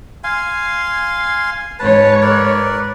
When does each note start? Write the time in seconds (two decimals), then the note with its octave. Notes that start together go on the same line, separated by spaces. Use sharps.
0.24 F5 G#5 C6
1.79 G#2 B4 C#5 A5
2.22 A#4 B4 D5